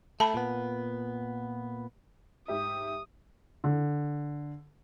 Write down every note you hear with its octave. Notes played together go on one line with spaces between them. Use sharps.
A3 A5 B5
A#2 B3
G#2 G4 E5 D#6
D3